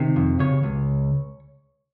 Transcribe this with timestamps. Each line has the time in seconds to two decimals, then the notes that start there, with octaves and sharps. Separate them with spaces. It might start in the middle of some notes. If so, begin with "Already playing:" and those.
Already playing: C3 D#3
0.16 F2
0.39 C#3 C#5
0.63 C#2